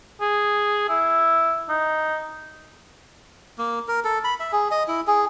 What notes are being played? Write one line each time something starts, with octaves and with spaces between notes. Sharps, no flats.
G#4
E4
D#4
A#3
A#4
A4
B5
E5
G#4
D#5
E4
G#4